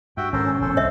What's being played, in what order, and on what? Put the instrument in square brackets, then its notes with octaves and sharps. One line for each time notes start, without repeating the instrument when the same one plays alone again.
[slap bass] G2 [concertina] F#4 E5 G5
[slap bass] G#1 [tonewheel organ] C#4 [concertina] A4 A#4 C5
[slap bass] E1 A2 [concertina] A4 C5
[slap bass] C2 [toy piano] C#5 D#5 E5